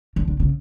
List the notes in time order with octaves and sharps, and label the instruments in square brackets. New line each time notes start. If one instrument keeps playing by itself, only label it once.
[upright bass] D3
D3
C#3